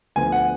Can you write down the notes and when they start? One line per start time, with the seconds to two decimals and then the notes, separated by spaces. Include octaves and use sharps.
0.16 D2 D3 F3 B3 G#5
0.32 F#5